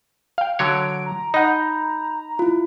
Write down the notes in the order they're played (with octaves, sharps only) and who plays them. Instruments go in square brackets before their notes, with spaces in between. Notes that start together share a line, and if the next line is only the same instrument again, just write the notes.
[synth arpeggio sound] F5 G5
[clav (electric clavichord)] D3 F#3 C#5 [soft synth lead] D7
[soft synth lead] A#5
[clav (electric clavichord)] D#4 [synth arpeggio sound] D#5 F#5 [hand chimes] B5 G6
[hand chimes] E4 F4